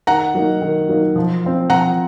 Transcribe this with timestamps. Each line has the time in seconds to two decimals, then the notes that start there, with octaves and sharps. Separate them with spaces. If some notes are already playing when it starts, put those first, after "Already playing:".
0.07 D#3 F#5 A#5
0.35 F#3 A#3 D#4
0.62 D#3
0.89 F#3 A#3 D#4
1.16 F3
1.43 C4 F4
1.70 F3 F#5 A#5